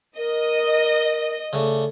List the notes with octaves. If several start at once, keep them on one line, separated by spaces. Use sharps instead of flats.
A#4 D#5
C#3 A3 D5